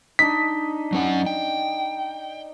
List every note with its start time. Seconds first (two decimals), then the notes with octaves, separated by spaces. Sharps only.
0.19 D4 D#4 B6
0.93 F#3 C#4 F#5
1.26 G5